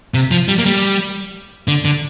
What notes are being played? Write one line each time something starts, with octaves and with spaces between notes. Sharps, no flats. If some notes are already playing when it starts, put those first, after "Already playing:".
C3
F3
G3
A#3
G3
D3
D3